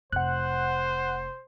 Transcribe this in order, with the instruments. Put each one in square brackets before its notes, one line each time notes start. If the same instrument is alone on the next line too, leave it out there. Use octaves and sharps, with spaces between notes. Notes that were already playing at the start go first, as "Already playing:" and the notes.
[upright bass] F1 [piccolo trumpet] C5 [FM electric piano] F#5 F#6